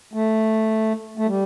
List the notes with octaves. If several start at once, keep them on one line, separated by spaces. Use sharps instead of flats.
A3
A3
G3